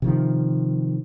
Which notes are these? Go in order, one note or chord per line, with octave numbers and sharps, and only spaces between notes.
C3 D#3 F3